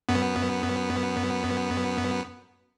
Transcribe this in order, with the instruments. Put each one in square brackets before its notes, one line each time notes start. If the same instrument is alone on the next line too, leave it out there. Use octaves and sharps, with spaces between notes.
[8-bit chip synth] F#2 B3